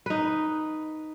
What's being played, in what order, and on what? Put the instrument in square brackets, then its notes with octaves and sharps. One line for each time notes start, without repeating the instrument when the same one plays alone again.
[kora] D#4 B4